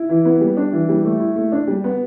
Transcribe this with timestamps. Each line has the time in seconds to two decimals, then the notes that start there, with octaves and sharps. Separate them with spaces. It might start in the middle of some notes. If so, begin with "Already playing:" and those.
Already playing: E4
0.09 E3
0.25 B3
0.41 G3
0.57 D4
0.73 E3
0.89 G3
1.04 A3
1.20 E4
1.36 A3
1.52 D4
1.68 G3
1.84 B3